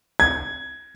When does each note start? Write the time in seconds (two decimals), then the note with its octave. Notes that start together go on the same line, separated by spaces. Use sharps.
0.20 G#6